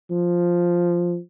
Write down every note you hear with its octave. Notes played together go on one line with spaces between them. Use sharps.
F3